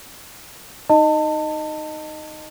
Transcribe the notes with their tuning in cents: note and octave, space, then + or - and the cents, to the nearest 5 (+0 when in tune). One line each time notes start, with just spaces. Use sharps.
D#4 +0 D#5 -15 A5 +30